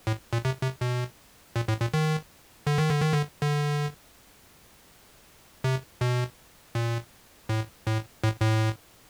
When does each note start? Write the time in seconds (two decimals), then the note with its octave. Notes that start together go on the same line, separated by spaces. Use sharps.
0.07 A2
0.33 A#2
0.45 C3
0.63 C3
0.81 B2
1.56 A#2
1.68 A2
1.81 A#2
1.94 D#3
2.67 D3
2.78 D#3
2.89 D3
3.02 D#3
3.13 D3
3.42 D3
5.64 C3
6.01 B2
6.75 A#2
7.49 A2
7.87 A2
8.24 A2
8.42 A2